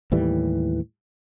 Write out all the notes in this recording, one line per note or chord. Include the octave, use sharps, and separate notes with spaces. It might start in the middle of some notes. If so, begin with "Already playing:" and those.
D#2 A2 E3 G3